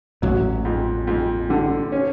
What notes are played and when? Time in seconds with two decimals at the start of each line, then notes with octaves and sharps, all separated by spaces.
0.22 A1 A2 F#3
0.65 F2
1.07 F2
1.50 D3
1.92 C#4